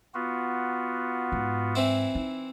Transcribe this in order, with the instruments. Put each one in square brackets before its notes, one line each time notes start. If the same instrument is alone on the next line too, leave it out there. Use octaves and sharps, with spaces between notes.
[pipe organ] B3 F4 F#4
[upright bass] G#2
[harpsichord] E3 C4 E4
[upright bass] D#4